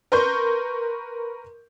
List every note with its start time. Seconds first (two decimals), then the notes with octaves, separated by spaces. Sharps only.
0.12 A#4 B4 C6 C#6 G6